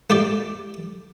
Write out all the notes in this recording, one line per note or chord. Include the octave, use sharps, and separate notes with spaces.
A3 G4 D5